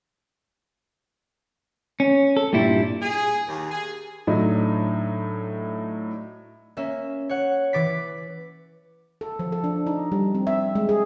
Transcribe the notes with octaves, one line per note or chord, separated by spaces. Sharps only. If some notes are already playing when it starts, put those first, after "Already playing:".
C#4
A4
G2 A#2 G3 E4
G#4
D#2
G#4
A2 F#3 D4 D#4
A#3 C#4 E5
C#5 F#5
E3 D6 A6 B6
A4
F3
A4
D4
D#4
G3
C4
E5
G#3
G#4